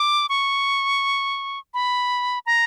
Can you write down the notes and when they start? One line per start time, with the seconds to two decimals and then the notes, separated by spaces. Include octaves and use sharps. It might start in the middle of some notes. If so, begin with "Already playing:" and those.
Already playing: D6
0.29 C#6
1.74 B5
2.46 A#5